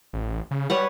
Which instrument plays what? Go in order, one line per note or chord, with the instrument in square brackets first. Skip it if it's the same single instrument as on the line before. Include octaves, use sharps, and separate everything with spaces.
[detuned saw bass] A1
C#3
[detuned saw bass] G3 [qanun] B4 C#5 F#5